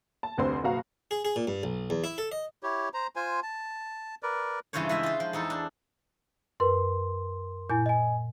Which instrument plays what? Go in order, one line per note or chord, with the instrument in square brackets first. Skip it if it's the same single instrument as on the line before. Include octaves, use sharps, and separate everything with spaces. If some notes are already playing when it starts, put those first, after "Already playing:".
[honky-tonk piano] A5
F1 D2 C4 C5 C6
F#1 B2 F#4 F5 A#5
[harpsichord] G#4
G#4
A#2
G2
B1
E2
E4
A4
D#5
[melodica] E4 G4 C#5
C5 A#5
F4 C5 G#5
A5
A#4 B4 D5
[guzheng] G2 C#3 E3 F4 C5 C#5
E3 G#3 E5
F4 C5
F3
E2 D#4 A4
D4
[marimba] F#2 B4 [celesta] A#4 C6
[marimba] A#2 [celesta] E4 G#5 G6
[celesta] D#5 G#5